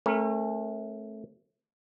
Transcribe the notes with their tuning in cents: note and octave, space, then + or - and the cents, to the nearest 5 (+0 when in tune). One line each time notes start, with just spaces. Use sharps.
A3 -10 C#4 -45 A#4 +5